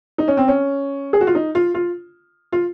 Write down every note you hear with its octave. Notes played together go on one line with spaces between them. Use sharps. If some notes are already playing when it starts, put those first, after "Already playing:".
D#4
C#4
C4
C#4
G#4
F#4
F4
D#4
F4
F4
F4